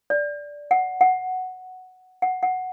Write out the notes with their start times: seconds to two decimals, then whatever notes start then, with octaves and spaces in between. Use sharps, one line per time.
0.10 D5
0.71 F#5
1.01 F#5
2.22 F#5
2.43 F#5